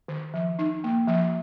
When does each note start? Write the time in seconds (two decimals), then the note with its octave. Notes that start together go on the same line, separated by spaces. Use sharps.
0.08 D#3
0.34 F3
0.59 D#4
0.84 A#3
1.08 F3